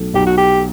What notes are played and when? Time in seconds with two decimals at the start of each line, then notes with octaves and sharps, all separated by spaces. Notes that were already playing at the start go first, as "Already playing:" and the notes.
Already playing: B1 A3
0.14 B1 G4
0.26 F#4
0.37 G4